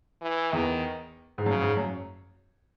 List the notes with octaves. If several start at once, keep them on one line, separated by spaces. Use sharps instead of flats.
E3
E2 D#3
G#2
F#2 C#3
G#2
F#2